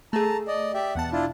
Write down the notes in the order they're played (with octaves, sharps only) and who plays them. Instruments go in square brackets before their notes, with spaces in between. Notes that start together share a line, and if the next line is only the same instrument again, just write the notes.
[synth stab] A3 G#4 [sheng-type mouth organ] A5 A#5
[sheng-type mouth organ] D5 D#5
G4 D5 E5
[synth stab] E2 B2 A5 [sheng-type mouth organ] F#5
[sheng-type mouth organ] D4 E4 F4